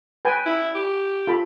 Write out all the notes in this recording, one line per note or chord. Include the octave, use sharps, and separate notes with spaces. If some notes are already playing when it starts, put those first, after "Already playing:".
B4 G5 G#5
E4
G4
F4 A4 B5